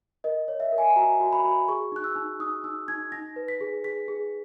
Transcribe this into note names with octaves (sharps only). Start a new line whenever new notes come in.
A#4 D#5
C#5
E5
A#4
G#5
F#4 A#5
F#4
B5
F#4
G#4 C#6
D#4 F#6
E6
D#4
D#4 D#6
D#4 E6
D#4 G#6
D#4 A#6
B4
B6
G#4
G#4 B6
G#4